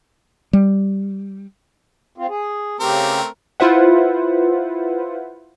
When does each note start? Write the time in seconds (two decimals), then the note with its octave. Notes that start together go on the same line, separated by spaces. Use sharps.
0.53 G3
2.18 C4 F4
2.29 G#4
2.80 C#3 A3 C4 G4 A#4
3.60 E4 F4 B4 C5 E5 F#5